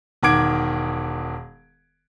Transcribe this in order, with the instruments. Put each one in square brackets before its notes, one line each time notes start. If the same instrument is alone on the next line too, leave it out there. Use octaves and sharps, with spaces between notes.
[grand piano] E1 D#3 F#5 D6 G#6 D7